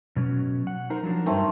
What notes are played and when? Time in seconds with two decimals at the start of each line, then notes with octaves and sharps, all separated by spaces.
0.16 B2 F#3 C#4
0.67 F#5
0.90 D#4 A#4 C5
1.03 F3 F#3 D4
1.26 G2 D#3 F#3 G3 A3 C4